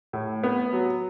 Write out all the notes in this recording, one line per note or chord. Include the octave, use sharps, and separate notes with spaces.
A2
B3
F#3